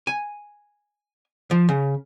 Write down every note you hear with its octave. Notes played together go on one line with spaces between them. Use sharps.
G#5
F3
C#3